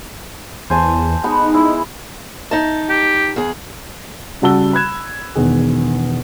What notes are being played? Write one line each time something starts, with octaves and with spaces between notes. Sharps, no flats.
E2 C5 G#5 A5
G#3 B3 D#4 B4
G#3 E4
D#4 A5
G4
E2 G#4
C#3 G3 F#4 A5 E6 G7
B5 F#6 G#6 E7
E1 E2 D#3 G#4